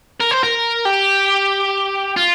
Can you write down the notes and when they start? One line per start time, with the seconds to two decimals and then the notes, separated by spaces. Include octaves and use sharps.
0.20 A#4
0.31 C5
0.43 A#4
0.85 G4
2.16 F4